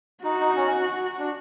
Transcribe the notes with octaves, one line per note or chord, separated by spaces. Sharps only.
D#4 F#4
D#4
C#4
D4